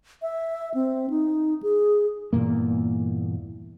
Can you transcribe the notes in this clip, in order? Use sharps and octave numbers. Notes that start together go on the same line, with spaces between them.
E5
C4
D#4
G#4
E2 G2 A#2 A#3